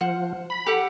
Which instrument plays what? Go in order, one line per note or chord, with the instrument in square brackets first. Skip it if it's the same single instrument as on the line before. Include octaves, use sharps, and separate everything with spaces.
[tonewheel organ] F3 [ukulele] C5 F#5
[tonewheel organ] B5
[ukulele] G4 A4 F#5